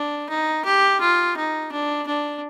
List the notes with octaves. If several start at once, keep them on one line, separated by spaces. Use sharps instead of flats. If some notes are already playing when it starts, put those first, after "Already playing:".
Already playing: D4
D#4
G4
F4
D#4
D4
D4